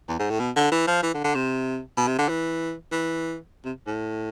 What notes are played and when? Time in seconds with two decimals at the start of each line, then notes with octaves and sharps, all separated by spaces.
0.08 E2
0.19 G#2
0.30 A2
0.40 B2
0.56 D3
0.72 E3
0.87 F3
1.03 E3
1.14 D3
1.24 D3
1.35 C3
1.97 B2
2.07 C3
2.18 D3
2.29 E3
2.92 E3
3.65 C3
3.87 A2